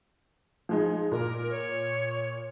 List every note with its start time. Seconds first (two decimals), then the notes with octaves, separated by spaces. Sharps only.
0.69 F3 G#3 D#4
1.12 A#2 A#4
1.51 C#5